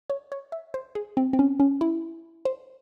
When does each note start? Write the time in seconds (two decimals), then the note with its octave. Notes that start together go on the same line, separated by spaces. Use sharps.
0.10 C#5
0.32 C#5
0.52 E5
0.74 C5
0.95 G#4
1.17 C4
1.33 C4
1.39 C#4
1.60 C#4
1.81 E4
2.45 C5